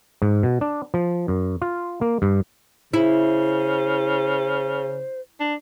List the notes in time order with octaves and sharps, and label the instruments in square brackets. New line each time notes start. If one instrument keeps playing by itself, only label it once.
[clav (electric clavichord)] G#2
B2
D4
F3
F#2
F4
A#3
G2
[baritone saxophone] C#3 [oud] E4 [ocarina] C5
[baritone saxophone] D4